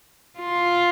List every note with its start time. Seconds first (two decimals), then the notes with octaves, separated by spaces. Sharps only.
0.39 F4